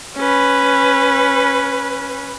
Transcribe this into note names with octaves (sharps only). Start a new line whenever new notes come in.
C#4 B4